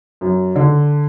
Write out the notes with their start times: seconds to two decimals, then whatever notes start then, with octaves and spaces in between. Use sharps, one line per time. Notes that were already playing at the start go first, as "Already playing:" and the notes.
0.21 F#2
0.56 D3